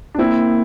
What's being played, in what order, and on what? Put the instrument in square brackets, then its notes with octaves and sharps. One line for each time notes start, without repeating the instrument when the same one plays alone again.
[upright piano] D4
[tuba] A#3 [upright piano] C4 E4